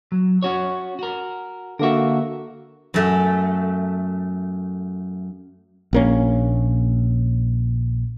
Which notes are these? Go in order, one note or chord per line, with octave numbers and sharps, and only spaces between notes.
F#3
C#4 F#4 C#5
F#4 A#4
D3 A#3 F#4 A#4 E5
F#2 A3
A#1 A#3 C#4